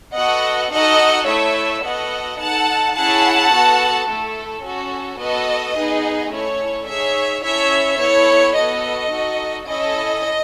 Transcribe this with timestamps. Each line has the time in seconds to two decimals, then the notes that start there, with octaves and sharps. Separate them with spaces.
0.15 B3 F#4 A4 D#5 F#5
0.71 D#4 F#4 A4 D#5 F#5
1.26 A3 E4 A4 C#5 E5
1.83 B3 F#4 A4 D#5 F#5
2.38 D#4 A4 F#5 A5
2.95 C#4 E4 G#4 F#5 A5
3.51 B3 F#4 A4
4.06 A3 E4 A4
4.63 C#4 F#4 A4
5.19 B3 F#4 A4 D#5
5.75 B3 D#4 G#4
6.30 A3 C#4 E4 A4 C#5
6.86 D#4 G#4 C#5 E5
7.42 C#4 E4 A4 C#5 E5
7.98 B3 E4 A4 C#5
8.55 B3 F#4 A4 D#5
9.10 D#4 F#4 A4
9.66 C#4 E4 A4 D#5